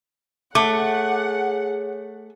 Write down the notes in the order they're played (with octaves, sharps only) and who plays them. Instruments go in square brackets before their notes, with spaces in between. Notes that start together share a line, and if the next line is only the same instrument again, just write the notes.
[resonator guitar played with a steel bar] A3 [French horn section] G#4 C#5 [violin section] F#5 [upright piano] D6